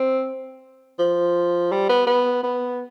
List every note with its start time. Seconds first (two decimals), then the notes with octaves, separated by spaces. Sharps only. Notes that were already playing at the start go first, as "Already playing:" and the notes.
Already playing: C4
0.99 F3
1.72 G3
1.89 B3
2.07 B3
2.43 B3